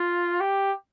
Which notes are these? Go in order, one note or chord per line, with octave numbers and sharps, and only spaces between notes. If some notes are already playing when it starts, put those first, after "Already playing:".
Already playing: F4
G4